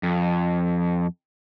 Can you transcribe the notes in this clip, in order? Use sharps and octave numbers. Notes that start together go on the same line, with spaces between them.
F2